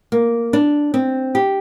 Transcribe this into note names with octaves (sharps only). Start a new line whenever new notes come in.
A#3
D4
C4
G4